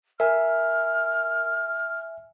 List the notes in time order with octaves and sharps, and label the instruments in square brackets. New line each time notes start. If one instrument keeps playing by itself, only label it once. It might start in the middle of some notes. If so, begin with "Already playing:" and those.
[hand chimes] A#4 [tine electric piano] E5 G#5 [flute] F6